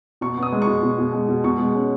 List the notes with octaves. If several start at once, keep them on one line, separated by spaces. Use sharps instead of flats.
B2 C#6
B3
D#6
G#3
C#6
B2
B2
B2
G#3
B2
B2 C#6
G#3
C#4